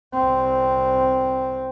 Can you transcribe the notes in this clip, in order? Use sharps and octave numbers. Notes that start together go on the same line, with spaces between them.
C2 C4